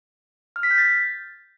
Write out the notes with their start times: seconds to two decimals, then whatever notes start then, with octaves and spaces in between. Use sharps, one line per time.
0.56 F6
0.63 B6
0.71 G6
0.78 A6